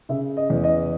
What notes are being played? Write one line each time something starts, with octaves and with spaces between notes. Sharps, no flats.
C#3 E5
D#5
E2
D#5